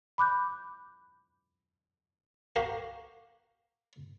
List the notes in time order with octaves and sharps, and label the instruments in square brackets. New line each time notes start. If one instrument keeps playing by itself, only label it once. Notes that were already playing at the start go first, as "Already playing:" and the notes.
[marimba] B5 D6 F#6 G6
[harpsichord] F#4 G4 A#4 F5